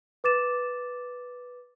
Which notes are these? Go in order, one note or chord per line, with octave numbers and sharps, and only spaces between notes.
B4 D6 A6 E7